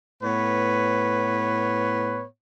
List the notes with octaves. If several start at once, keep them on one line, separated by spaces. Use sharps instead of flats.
A2 B3 B4 C#5